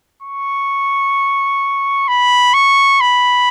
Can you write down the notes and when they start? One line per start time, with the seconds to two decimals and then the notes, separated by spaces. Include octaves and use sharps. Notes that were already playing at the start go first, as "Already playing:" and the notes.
0.23 C#6
2.08 B5
2.54 C#6
3.01 B5